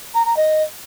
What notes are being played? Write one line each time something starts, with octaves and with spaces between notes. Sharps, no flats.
A#5
A#5
D#5